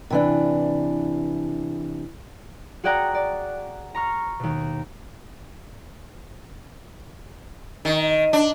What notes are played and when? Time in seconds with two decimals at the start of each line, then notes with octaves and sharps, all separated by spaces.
0.10 C3 E3 D4
2.84 F#4 G#4 D5 F#5 G5 A#5
3.14 D5
3.95 A#5 C#6 F6
4.40 D#2 B2
7.85 D#3
8.33 D4